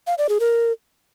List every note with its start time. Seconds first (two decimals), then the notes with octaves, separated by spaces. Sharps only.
0.07 F5
0.18 D5
0.29 G#4
0.40 A#4